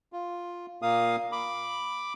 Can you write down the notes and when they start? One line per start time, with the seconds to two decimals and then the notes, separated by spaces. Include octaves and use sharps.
0.13 F4
0.82 A#2 A#3 F5 D#6
1.32 B5 D6